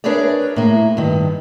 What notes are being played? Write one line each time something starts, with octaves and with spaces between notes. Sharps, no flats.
D4 G#4 A#4 B4 C#5 D5
A2 A#3
G2 D#3